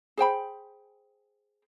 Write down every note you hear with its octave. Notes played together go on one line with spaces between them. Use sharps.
G#4 C5 G5 B5